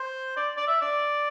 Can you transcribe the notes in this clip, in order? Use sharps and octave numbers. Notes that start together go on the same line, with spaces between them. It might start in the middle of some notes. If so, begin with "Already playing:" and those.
Already playing: C5
D5
D5
E5
D5